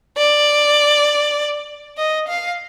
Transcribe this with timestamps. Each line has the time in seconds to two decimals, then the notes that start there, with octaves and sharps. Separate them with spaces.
0.17 D5
1.97 D#5
2.28 F5